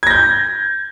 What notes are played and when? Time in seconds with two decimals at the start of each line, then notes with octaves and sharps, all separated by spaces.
0.03 G#6
0.07 A#6
0.10 G6